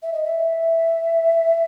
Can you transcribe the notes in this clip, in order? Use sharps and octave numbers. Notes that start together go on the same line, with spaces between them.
E5
D#5
E5